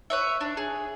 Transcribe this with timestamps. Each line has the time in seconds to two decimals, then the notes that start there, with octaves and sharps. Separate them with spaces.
0.10 B4 C#5 E5
0.41 D4
0.57 G#4